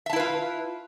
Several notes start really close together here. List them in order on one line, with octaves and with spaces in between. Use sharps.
E5 A5 E4 B4 F4